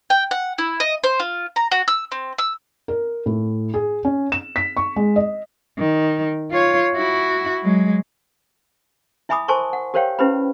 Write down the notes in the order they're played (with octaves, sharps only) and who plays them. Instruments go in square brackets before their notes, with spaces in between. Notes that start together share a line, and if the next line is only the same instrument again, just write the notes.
[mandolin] G5
F#5
E4
D#5
C5
F4
A#5
F#4
E6
C4
E6
[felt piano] A#4
A2
G#4
C#4
E7
B6
C#6
G#3
D#5
[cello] D#3
F4 C#5
E4 F#4
F#3 G#3
[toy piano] E4 E5 G#5 B5 D6 D#6
A#4 C5 G#5 A5 C6 C#6
F#5
G4 A#4 C5 C#5 F5 G5
C#4 E4 G4 B4 C5 B5